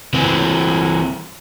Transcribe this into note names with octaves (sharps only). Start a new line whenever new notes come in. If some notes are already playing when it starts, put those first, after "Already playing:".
E3 C4